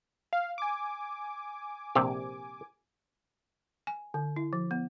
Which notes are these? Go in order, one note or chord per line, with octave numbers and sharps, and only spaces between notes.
F5
G#5 D6
A#1 C3 G4
G#5
D3
E4
F3
B3